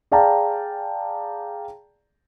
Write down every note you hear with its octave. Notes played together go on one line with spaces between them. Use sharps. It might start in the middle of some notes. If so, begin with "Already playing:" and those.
G#4 D5 F5 G5 A5 A#5